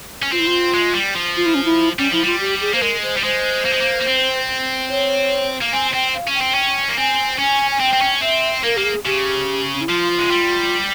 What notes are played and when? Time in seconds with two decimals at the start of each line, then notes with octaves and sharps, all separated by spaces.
0.23 C#4
0.32 C4 F4
0.39 E4
0.47 F4
0.74 G#3
0.94 G3
1.15 F3
1.37 F4
1.46 E4
1.55 C#4
1.65 E4
1.99 G3 C#4
2.11 F3 E4
2.23 G3 F4
2.40 G4
2.61 G#4
2.74 A#3 C5
2.82 G#3 A#4
3.03 C5
3.17 G3
3.23 G#3 C5
3.65 A#3
3.73 G#3
3.81 A#3
4.01 A#3
4.06 C4
4.89 C#5
5.62 A#3
5.73 C4 G#5
5.94 C4 G5
6.14 F5
6.28 C#4
6.35 G5
6.41 C4
6.55 C#4
6.89 A#3
6.97 C4 G#5
7.38 C#4 G#5
7.71 G#5
7.80 C4 G5
7.94 C4
8.02 C#4
8.22 C4 E5
8.64 A#3 A#4
8.77 A#3 G4
8.85 G#4
9.05 C#3 G4
9.74 C#4
9.81 E4
9.88 F3 F4
10.18 G#3
10.31 G3